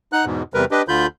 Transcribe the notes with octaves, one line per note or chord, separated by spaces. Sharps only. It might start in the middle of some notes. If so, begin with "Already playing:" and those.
D#4 F#5 F#6
E2 G#2 B2
E2 C3 G3 A#4 B4
D4 G4 B4 D#5
D2 D3 F4 B5 G6